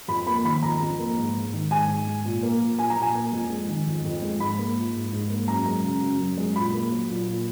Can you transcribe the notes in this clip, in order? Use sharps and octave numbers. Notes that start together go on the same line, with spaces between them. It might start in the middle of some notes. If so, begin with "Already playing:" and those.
F2 B5
A#3 B5
D#3 B5
F2 A#5
F2
A#3
G#2
G#3
D#3
G#2 G#5
G#2
G#3
A#2
A#3
F3
A#2 G#5
A#5
A#2
G#5
A#3
F2
G#3
D#3
F2
F2
G#3
G#2 B5
A#3
F3
G#2
G#2
A#3
F#2 A#5
G#3
C#3
F#2
F#2
G#3
A#2 B5
A#3
F#3
A#2
A#2